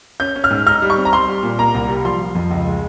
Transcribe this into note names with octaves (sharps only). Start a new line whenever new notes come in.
C#4 G6
C#4
F6
G#2
D#4 F6
G3
C#6
C4
A#5
G3 C6
G3
A#2
A#3 A#5
C2
G3
F3 C6
F3
F2
C#2
G#3